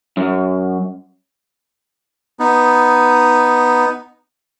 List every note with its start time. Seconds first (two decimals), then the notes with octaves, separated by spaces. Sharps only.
0.17 F#2
2.39 B3 D#4